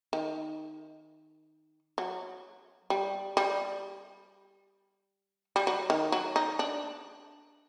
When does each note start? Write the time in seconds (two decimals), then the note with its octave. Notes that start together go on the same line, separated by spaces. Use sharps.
0.13 D#3
1.98 F#3
2.90 G3
3.37 G3
5.56 G3
5.67 F#3
5.90 D#3
6.12 F#3
6.36 D#4
6.59 D4